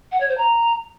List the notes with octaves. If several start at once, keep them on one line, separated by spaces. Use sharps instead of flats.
F#5
C#5
C5
A#5